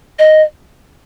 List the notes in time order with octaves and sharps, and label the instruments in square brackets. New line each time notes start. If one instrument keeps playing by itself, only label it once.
[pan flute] D#5